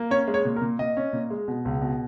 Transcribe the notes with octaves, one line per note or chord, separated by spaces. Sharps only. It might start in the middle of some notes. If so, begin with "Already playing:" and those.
Already playing: A#3
C#4 C#5
G#3
C#5
A#2
A#4
A#2
A#2 D#5
C#4
A#2
G#3
B2
C#2
B2